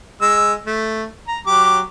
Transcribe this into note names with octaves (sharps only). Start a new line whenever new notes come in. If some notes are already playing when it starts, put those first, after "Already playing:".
G#3 E6
A3
A#5
F#3 G4 D6